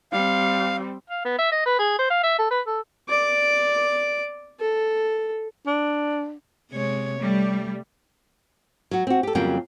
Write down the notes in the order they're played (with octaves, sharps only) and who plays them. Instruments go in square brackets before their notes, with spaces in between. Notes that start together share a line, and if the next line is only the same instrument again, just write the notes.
[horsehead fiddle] G3 C4 [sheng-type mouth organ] F5
[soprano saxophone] F5
B3
E5
D#5
B4
G#4
C5
F5
E5
A4
B4
A4
[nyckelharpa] D5 D6
A4
[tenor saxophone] D4
[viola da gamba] C3 G#3 C#5
[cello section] G3 [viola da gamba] A3
[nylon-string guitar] F#3 F#4
C4 F#4
G4 A4
F2 C#3 F#3 G3 A#3 G5